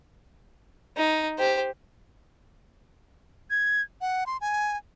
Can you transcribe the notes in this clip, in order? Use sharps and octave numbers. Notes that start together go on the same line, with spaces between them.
D#4
G4 C5
G#6
F#5
C6
G#5